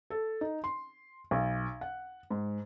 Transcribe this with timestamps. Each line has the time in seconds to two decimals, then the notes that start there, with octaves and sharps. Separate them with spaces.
0.10 A4
0.41 D#4
0.64 C6
1.31 B1
1.81 F#5
2.30 G#2